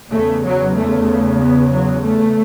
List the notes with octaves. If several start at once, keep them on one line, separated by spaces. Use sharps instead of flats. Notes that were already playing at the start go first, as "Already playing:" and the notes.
E2 C#3 A3
F#3
A3
B3
F#3
A3